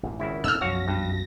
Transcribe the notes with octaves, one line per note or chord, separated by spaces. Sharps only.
A1 G2 A#2
G#1 A#2 C#3 E4
A#2 C4 D#4 A4 E6 F6
B1 F#2 F3 F#4 C#5 F5 A#6
G2